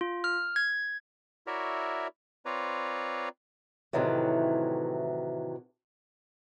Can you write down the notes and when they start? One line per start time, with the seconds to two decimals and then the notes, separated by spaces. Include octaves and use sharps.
0.01 F4
0.24 F6
0.56 G#6
1.47 E4 F#4 A#4 C#5 D5 E5
2.46 C4 F4 B4 C#5 D5 A#5
3.93 A2 C3 D#3 E3 F#3 A3